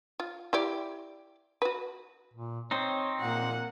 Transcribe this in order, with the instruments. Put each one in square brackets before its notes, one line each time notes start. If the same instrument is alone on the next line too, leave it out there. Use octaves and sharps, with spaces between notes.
[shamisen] F4
E4 G4 D5
F#4 B4
[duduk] A#2
[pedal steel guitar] C4 D#4 [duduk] C#5
[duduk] A#2 [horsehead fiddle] A#3 F#5